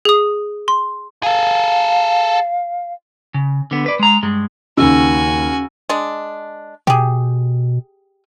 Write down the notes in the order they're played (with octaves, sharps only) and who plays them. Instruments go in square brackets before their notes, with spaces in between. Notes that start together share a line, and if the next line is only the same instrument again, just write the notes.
[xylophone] G#4 D#6
C6
[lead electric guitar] G#4 A4 [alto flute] F5
[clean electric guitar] C#3
D3 B3
B4 D5
G#3 A#5
G2 G#3
[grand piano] D#2 E6 [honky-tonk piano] C#3 [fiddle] F#4 G#5
[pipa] G#3 D4
[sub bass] B2 [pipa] G4 G#4